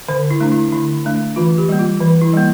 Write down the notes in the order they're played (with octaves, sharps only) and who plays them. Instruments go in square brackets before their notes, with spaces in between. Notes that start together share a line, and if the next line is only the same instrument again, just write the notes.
[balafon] D3 C5
E4
A3 D4
E4
D3 E4
A3 D4
E3 F4
G4
G3 A#3
F4
E3
E4
G3 A#3